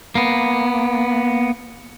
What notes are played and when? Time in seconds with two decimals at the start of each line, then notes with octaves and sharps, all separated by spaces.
0.15 A#3 B3